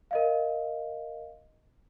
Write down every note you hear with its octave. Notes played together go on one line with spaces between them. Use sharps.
A#4 D#5 F5